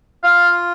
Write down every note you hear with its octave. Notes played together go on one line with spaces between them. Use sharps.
F4 F5